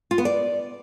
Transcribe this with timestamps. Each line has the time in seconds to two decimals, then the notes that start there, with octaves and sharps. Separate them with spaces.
0.11 F4
0.18 B3
0.25 D5